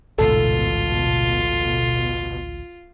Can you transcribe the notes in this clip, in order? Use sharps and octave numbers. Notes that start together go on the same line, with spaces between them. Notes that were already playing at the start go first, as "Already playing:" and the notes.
A1 D2 G#2 B2 F4 A4 A5